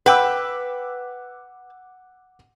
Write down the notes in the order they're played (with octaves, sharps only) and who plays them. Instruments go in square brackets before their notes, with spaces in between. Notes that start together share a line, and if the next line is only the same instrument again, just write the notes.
[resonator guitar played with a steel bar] B4 G5 [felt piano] F#5 D6 E6